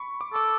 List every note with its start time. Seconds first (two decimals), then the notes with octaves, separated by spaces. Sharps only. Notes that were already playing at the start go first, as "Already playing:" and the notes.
Already playing: B5 C#6
0.21 D6
0.33 A4 D6